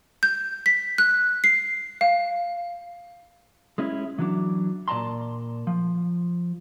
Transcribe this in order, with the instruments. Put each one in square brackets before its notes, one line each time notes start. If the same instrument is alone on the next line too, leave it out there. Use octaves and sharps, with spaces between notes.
[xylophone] G6
B6
F#6
C7
F5
[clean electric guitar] G#3 C#4 E4
E3 F#3 D4
A#2 D5 A5 A#5 C6
F3